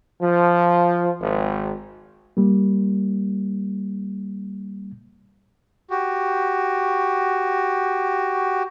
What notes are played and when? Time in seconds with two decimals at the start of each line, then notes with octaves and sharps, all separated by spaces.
0.21 F3
1.20 G#1
2.37 G3 A#3
5.90 F#4 G4